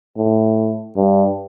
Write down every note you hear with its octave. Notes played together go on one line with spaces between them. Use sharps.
A2
G2